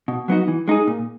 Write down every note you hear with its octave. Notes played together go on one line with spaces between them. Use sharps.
B2
F#3 B3 D#4 F#4
E3
G#3 D#4 G#4
A#2